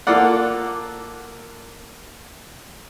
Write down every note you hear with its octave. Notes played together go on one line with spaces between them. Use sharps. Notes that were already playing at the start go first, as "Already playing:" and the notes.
A#3 F4 A4 D5 F#5